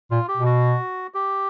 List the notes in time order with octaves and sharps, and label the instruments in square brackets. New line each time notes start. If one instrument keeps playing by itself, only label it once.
[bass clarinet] A#2 [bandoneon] F4
[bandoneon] G4
[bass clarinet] B2
[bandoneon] F#4
G4